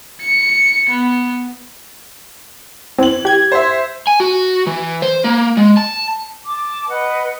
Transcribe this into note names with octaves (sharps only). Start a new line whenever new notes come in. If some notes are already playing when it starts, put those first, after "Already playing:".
C#7
B3
E3 C4 F#7
G4 G#6
C5 E5
G#5
F#4
E3
C5
A#3
G#3
A5
A5 D6
B4 D#5 F#5